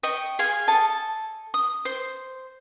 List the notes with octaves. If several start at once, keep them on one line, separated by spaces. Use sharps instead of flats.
D#5 G5 C#6
G#4 F5 G#5 C6
A4 D#5 A5
D#6
C5